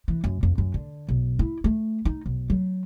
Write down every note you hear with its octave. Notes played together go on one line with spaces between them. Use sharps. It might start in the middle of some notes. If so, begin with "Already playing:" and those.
E3
F#2
F2
F#2
D3
B1
E4
A3
D#4
B1
F#3